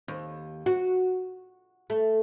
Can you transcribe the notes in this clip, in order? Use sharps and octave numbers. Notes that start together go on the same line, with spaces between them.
D#2
F#4
A3